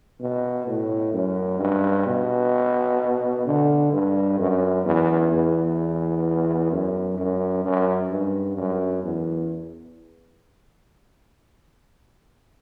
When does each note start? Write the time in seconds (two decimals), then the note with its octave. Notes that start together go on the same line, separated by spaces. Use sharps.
0.20 B2
0.67 A2
1.13 F#2
1.60 G2
2.06 B2
3.46 D3
3.92 G2
4.39 F#2
4.85 E2
5.32 E2
6.72 F#2
7.18 F#2
7.65 F#2
8.11 G2
8.57 F#2
9.04 E2